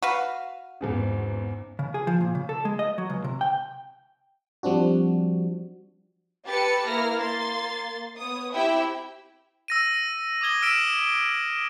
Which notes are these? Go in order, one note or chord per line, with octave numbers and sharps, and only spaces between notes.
F#4 B4 F5
G#1 E2 C#3
C#3
G#4
F3
A#2
C#3
A4
G#3
D#5
F#3
C#2
C3
G5
F3 G3 C4 D4 F#4
G4 A4 B4 A6 C#7
A#3 E4 F6 A#6
A#3 C6 A6
B3 C#5 D#6
C4 E4 G4 E5 G5
E6 A#6 D#7
D6 D#6 G#6 G7
E6 F6 B6 D7 E7